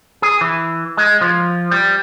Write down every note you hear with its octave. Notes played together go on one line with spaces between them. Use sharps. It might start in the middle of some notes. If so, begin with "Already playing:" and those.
G#4
E3
G#3
F3
G3